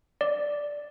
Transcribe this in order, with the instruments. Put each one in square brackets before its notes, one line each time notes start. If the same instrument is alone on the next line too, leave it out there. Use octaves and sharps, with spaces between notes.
[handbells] D5